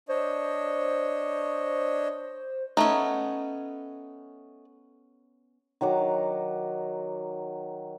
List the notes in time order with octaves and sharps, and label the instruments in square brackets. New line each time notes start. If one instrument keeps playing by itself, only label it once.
[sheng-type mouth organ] D4 C#5 D#5 [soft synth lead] C5
[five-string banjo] A3 D#4 [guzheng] B3 C#4
[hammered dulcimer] D#3 F#3 F#5 D6